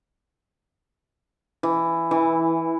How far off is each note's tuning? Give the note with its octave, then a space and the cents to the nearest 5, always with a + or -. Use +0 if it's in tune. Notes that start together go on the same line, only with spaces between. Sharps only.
E3 +10
E3 -10